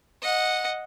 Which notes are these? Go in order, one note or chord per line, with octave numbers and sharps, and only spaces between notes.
D#5 F#5